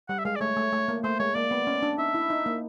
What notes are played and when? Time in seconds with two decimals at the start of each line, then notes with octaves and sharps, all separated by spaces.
0.09 G3 F#5
0.18 E5
0.25 G#3 F5
0.36 D5
0.41 A3 C#5
0.57 A3
0.72 A3
0.88 A#3
1.04 A3 C5
1.19 G#3 C#5
1.35 A#3 D5
1.51 B3
1.67 C#4
1.83 D4
1.98 D#4 E5
2.14 E4
2.30 D#4
2.46 A#3